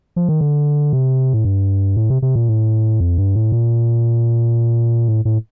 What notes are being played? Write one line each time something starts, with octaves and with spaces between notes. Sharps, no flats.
F3
D#3
D3
C3
A2
G2
A2
C3
C3
A#2
A2
F2
G2
A2
A#2
A2
A2